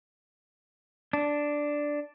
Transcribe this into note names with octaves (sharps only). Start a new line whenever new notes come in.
D4